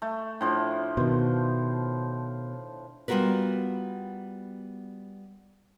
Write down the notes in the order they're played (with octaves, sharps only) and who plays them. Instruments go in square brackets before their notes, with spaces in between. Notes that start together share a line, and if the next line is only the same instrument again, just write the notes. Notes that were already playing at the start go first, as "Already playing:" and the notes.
[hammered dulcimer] A3
A2 F3 D4
[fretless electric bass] B2 D#3 [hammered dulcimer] C5
[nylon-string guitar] G3 B3 F4 F#4 A#4 B4